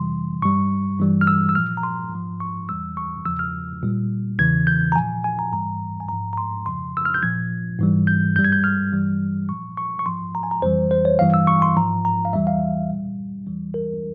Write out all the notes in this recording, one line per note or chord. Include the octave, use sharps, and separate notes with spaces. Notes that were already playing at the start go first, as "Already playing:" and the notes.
Already playing: F2 C3 E3 G3 C6
G2 G3 C#6
G2 E3 G3
F6
E6
E6
A#2 F3 F6
A#5
C6
G#2 F3
C#6
E2 E3 G3 E6
C#6
E2 C#3 F3 E6
F6
A#2 G3
E2 C#3 E3 G#6
G6
A#5
A#2 F3 G#5
G#5
A#5
G#2 E3 G3 A#5
G#5
G#2 F3 A#5
A#5
C6
F2 C#3 F3 C6
E6
F6
G6
A#2 F3 G#6
G#2 E3 G3
G6
G2 G3 G6
G#6
G6
F6
G2 E3 G3
A#2 F3 C#6
C#6
C#6
G#2 F3 C6
A#5
G#5
A#5
F2 E3 G3 C5
C5
C#5
G2 E3 G3 F5
E6
C#6
C6
G#2 F3 A#5
A#5
F5
E2 E3 G3 E5
F5
A#2 G3
E2 E3 G3
A#4